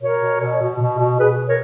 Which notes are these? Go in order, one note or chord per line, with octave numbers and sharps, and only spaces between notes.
B2 A#4 C#5
B2
B2
B2
B2
B2
B2 G#4 B4
B2
A#4 C#5